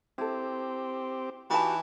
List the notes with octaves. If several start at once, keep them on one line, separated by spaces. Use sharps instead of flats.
C4 E4 G4 A4
E3 D#4 F#4 G4 B4 A5